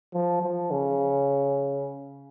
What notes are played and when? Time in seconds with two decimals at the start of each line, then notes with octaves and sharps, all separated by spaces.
0.14 F3
0.43 F3
0.71 C#3